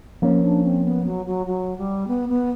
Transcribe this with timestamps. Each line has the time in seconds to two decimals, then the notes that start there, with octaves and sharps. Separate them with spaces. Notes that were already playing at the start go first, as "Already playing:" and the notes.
0.22 F3 A#3 C#4
0.43 D4
0.63 C4
0.84 B3
1.05 F#3
1.25 F#3
1.46 F#3
1.77 G3
2.07 B3
2.28 B3